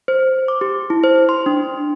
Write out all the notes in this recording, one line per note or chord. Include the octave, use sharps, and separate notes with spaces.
C5
D6
G4
E4
C5
C6
D4